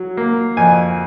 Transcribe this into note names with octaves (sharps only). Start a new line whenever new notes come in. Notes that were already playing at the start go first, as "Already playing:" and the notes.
Already playing: F#3
A#3
F2 G#5